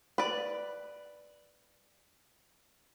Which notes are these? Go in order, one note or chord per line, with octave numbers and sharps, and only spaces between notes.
B4 D5